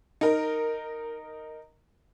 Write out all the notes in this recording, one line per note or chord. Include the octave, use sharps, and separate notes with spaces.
D#4 A#4